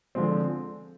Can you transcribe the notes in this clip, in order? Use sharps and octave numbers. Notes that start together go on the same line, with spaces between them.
D3 F3 G#3 C4